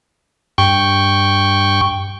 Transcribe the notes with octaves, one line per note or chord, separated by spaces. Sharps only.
G2 G5 C#6